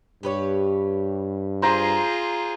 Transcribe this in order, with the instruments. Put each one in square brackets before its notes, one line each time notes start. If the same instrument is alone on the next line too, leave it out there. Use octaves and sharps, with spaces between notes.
[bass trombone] G2 [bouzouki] G4 B4 C#5
[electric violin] F4 G#4 [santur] C5 A#5